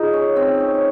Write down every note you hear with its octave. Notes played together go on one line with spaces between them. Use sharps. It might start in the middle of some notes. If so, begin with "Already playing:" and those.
Already playing: D#4 F4 G#4 D#5
C#4
C4
C#4
C#4